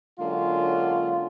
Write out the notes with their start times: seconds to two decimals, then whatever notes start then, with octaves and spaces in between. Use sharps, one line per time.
0.19 D3 F#3 G#3 A#3 C#4 F4